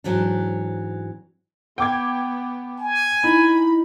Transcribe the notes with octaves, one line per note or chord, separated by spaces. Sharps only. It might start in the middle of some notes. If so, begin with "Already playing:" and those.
G#2 E3 F#3 C4 D4
B3 G5 D6 G#6
G#5
D#4 E4 B5